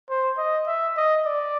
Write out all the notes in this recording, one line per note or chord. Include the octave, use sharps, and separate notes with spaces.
C5
D#5
E5
D#5
D5